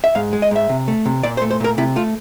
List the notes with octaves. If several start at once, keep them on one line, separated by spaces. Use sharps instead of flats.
E5
G#2 F5
G#3
D#5
G#2 E5
C3
A3
C3
A#2 D5
C5
A3
C5
A#2 A#4
C3 E4
A3 F4